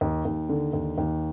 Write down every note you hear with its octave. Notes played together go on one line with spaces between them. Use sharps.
D#2
D#2
D3
D#2
D#2